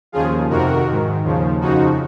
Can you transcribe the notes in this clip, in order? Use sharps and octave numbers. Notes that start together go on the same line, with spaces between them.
D#2 C#3 F3 F4 G#4
F2 C3 D#3 F#4 A#4
G#2 D#3
D#2 C#3 F3
F2 C#3 F3 D#4 F#4